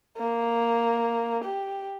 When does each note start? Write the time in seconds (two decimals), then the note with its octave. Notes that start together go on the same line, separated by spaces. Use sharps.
0.18 A#3
1.44 G4